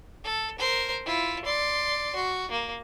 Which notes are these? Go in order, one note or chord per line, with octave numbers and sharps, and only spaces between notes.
A4
A#4 C5
E4 F4
D5 C6
F#4
A#3